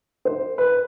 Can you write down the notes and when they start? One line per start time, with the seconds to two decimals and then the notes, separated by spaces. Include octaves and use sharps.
0.25 C5
0.58 B4